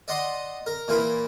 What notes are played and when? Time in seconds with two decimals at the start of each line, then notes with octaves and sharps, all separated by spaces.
0.08 D5 D#5 F#5 C6
0.66 A#4
0.88 A#2 E3 F4 A#4 B5